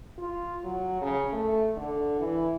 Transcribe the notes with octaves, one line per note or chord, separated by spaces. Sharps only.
F4
F#3
C#3
A3
D3
E3